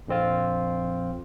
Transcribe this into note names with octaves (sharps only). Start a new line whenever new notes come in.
A#1 F2 C4 F4